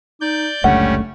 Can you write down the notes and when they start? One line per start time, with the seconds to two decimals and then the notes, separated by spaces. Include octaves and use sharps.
0.21 D#4 D5 G6
0.64 F#1 C#2 D3 G3 A3 C#4 F#5